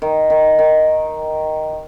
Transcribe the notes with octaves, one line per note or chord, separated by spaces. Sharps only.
D#3
D#3
D#3